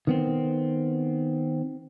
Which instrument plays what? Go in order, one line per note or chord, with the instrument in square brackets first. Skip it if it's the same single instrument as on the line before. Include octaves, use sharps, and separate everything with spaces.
[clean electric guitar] D#3 B3 C4